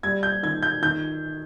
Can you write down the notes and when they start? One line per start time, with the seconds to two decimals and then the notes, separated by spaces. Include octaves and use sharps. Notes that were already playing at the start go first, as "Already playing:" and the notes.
0.03 G3 G#6
0.23 G6
0.43 D#3 G#6
0.63 G6
0.82 D#3 G6